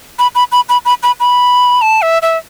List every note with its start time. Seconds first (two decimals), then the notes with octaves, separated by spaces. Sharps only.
0.19 B5
0.35 B5
0.52 B5
0.69 B5
0.85 B5
1.03 B5
1.20 B5
1.82 A5
2.02 E5
2.22 E5